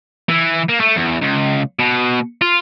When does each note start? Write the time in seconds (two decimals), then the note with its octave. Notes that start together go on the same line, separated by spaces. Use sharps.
0.29 E3
0.69 A#3
0.81 A3
0.97 E2
1.22 C#2
1.79 B2
2.42 F4